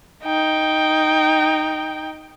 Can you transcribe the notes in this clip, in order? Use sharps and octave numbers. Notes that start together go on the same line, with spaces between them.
D#4 G5